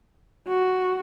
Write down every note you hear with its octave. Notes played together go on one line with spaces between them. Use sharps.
F#4